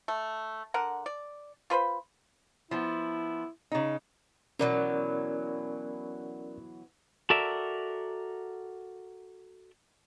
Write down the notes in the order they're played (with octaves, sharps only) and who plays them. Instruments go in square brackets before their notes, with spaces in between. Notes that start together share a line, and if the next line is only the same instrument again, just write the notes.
[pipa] A3
D3 A#4 F#5
D5
F4 B4 C5 B5
[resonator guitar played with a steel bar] F3 B3 [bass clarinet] E4
[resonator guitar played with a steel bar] C#3 D#4
[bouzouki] B2 E3 F#3 [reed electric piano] C#4 A#4 D5
[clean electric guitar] F#4 A4 A#4 D5 E5